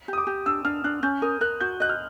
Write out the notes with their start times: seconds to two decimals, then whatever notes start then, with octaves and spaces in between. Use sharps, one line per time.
0.08 G4 D#6
0.18 D6
0.27 G4
0.46 D4 E6
0.65 D4 F6
0.84 D4 F#6
1.03 C#4 G6
1.22 A#4 D#6
1.41 A#4 F#6
1.61 F#4 G6
1.80 D#5 F#6
1.89 F6